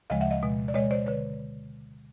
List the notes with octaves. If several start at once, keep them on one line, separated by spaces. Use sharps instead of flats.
D2 C#3 F3 G#3 D#5 F5
E5 F#5
D#5 F5
B2 G#3
D5
B2 G#3 C#5 D#5
C5 D5
D3 B4 C#5